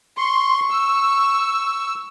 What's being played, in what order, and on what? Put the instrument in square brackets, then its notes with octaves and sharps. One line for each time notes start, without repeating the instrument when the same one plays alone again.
[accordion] C6 [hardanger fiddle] C#6
[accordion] E6